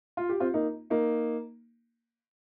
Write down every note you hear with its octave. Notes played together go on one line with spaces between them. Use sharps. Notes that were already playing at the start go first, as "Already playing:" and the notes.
F4
G4
C4 F4
A#3 D#4
A#3 D#4